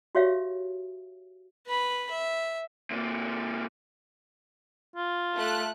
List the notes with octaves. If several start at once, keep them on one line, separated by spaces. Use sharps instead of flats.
F#4 G4 C#5 E5 F5
B4 B5
E5
C3 A#3
F4
A3 F#6